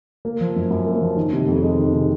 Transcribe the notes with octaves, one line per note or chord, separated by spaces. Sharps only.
A#3
F3
F#2
F#2
A#3
F3
D#3
C3
F2
G#3
D#3
C3